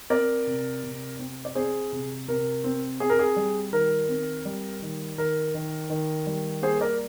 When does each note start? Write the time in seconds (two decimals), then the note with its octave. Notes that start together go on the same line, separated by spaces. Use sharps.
0.10 C4 A#4 D5
0.47 C3
0.83 C3
1.19 C4
1.45 D5
1.55 C4 G#4 C5
1.92 C3
2.28 C3 A#4
2.64 C4
3.00 C4 G#4
3.10 A#4
3.19 G#4
3.36 G3
3.73 D#3 A#4
4.09 C4
4.45 G3
4.82 D#3
5.18 D#3 A#4
5.54 D#3
5.90 D#3
6.27 G3
6.62 A#3 G#4 C5
6.81 A#4 D5